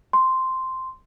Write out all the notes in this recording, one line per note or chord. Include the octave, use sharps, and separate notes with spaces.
C6